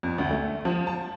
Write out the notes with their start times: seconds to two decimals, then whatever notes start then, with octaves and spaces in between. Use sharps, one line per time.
0.03 F2
0.18 D2
0.31 A3
0.65 F3
0.87 A5